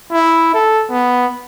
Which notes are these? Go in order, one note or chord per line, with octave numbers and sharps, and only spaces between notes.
E4
A4
B3